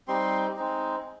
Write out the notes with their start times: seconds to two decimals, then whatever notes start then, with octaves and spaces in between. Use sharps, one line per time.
0.08 G3 C4 D#4 C6
0.56 G#3 C4 D#4